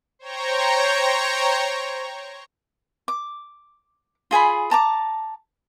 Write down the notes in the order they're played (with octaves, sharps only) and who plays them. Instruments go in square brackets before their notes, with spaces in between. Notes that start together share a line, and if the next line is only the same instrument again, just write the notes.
[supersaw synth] C5 C#5 G5 A#5 C#6
[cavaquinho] D6
F4 G#4 G#5 B5
A5 A#5 D6